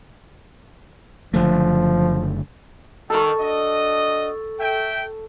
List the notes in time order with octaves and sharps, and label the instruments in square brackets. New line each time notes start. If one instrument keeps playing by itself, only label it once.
[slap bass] F#1 D3 A3 [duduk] F3
[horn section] D#3 [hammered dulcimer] A4 C#6
[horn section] D4 F#4 D#5
A4 E5 G5